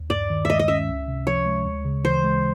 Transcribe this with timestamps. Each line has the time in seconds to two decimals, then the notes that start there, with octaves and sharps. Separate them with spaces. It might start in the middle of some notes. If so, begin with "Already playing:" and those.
Already playing: D#2
0.10 G2 D5
0.30 D#3
0.45 G#3 D#5 E5
0.59 D#5
0.68 C#4 E5
0.88 C#2
1.08 C3
1.27 F3 C#5
1.46 G#3
1.66 D2
1.85 C#3
2.04 E3 C5
2.24 G#3